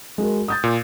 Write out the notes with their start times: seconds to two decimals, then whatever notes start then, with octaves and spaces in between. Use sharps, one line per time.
0.18 G#3 F#4 A#4
0.48 D#6 G6 A6
0.64 A#2